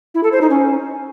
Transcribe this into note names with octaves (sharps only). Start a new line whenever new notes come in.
E4
A4
C5
D#4
C#4